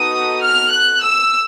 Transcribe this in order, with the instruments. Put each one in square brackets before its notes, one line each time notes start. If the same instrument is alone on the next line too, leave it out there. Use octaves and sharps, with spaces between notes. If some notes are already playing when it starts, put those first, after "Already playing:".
Already playing: [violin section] B3 D#4 F#4 A4 D#6
F6
F#6
E6